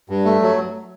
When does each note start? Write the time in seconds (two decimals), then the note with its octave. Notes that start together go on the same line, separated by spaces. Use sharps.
0.10 G2
0.25 A3
0.42 F#3